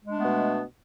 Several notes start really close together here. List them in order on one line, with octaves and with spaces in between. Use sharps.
G#3 D4 A3 B3 B2